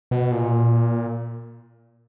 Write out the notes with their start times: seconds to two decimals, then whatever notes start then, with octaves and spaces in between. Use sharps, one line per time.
0.11 B2
0.32 A#2